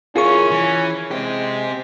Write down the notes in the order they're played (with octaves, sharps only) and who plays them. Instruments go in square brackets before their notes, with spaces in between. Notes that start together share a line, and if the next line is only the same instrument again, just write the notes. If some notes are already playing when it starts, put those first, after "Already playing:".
[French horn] C#4 [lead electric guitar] E4 A#4 [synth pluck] F4 G#4 C#6
[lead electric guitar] E3
[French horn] G#3 [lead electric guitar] C4 G4